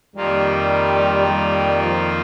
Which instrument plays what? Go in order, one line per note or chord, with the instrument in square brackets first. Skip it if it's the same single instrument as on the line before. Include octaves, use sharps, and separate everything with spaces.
[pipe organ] F2 D#3 A#3 F4 [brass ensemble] G3
[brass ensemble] G3
F3